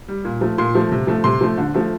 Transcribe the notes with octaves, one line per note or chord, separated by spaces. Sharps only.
G3
A#2
F3 A3
A#2 C6
F3 A3
C3
F3 A3
C3 C6
F3 A3
D3
F3 A3